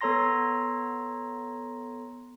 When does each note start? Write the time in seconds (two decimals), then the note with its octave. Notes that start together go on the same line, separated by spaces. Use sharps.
0.01 B3 A4 C#5 A#5 C6 A#6